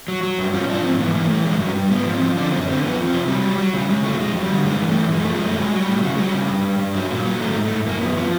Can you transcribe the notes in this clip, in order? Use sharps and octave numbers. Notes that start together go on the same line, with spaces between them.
F#3
F#3
G2
F3 C#4
F3 D4
G#2 C4
E3 B3
E3 A#3
E3 A3
G2 G#3
G2 F#3
G2 G3
G#2 B3
F3
C4
F3
D3 D4
F#2 C4
C#4
D3 C4
F2 B3
F3
C4
C3
F#3 G3
F#3
F#3
C#3 G3
C#3 G#3
F#3 A3
F2 G#3
F#3
G3
D3
G2 G#3
E3
A3
G2
F#2 G#3
F3 A3
G#3
F#2 A3
F#3 G#3
F#3
G3
A2
C#3 F#3
F#3 G#3
G3
C#3
G2
G2
G2
F#3
A#2
F#3
G#2 A3
G#2
A3
G#2
F#2 A#3
F#2 B3
F3 B3